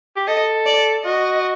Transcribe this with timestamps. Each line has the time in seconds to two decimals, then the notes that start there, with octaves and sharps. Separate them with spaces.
0.16 G4
0.28 A4 D#5
0.66 D5
1.05 F#4 D#5